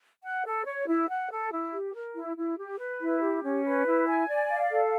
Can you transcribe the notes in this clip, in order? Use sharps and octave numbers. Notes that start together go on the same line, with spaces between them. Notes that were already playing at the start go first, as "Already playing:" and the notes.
F#5
A4
C#5
E4
F#5
A4
E4
G4
A#4
E4
E4
G4
B4
E4
G4
C#4
B4
E4
G#5
D5
F5
A4